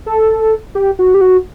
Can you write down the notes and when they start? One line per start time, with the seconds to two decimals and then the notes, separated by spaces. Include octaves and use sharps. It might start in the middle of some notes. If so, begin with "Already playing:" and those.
0.06 A4
0.75 G4
0.99 F#4
1.14 G4
1.21 F#4